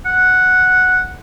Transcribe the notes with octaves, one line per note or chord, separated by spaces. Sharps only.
F#5